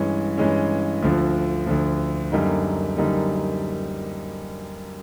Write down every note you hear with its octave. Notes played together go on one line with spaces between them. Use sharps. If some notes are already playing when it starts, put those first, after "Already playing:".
Already playing: G2 E3 G#3 C#4
G2 E3 G#3 C#4
D2 D3 F3
D2 D3 F3
F#2 D3 G3 A#3 D#4
F#2 D3 G3 A#3 D#4